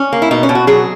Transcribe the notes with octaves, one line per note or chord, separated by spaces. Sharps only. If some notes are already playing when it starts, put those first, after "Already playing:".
Already playing: C#4
A#3
E4
B2 D#4
C#4
B2
F#4
F#3 G#4